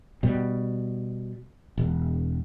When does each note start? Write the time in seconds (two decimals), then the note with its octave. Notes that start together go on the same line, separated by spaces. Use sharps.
0.23 B2 G3
1.78 E1